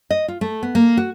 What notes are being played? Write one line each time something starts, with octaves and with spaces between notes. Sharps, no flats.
D#5
F4
A3
B3
A#3
F#4